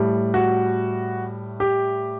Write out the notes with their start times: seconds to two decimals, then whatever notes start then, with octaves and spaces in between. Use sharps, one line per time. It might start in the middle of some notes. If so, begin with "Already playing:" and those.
Already playing: A2 G3
0.34 F#4
1.60 G4